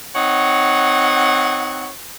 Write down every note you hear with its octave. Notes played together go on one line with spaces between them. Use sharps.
C4 D#4 C#5 F#5